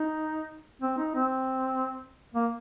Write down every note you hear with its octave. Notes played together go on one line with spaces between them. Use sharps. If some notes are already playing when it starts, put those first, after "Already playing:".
Already playing: D#4
C4
D#4
C4
A#3